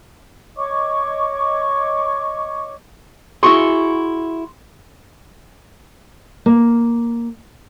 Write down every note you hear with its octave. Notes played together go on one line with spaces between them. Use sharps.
C#5 D#5 C#6 D6
E4 F#4 G#4 C6 C#6
A#3